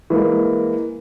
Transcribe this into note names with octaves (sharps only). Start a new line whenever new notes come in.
E3 G#3 A#3